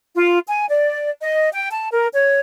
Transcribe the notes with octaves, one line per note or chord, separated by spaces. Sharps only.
F4
G#5
D5
D#5
G5
A5
A#4
C#5